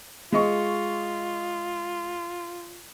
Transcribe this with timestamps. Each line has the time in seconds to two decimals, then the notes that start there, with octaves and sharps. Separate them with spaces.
0.32 G#3 F4 D#5 C#6